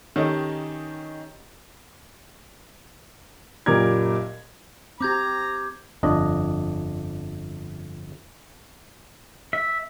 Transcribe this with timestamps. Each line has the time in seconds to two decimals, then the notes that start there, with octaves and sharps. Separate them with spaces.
0.16 D#3 C#4 D#4 G4 A4
3.66 F#1 A#2 G4 A#4 G#6
5.01 C4 G4 A#5 D6 G6 G#6
6.03 G1 F2 D4 D#5
9.53 E5